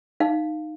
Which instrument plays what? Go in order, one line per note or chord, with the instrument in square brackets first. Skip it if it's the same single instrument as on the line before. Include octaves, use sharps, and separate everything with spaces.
[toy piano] D#4 F5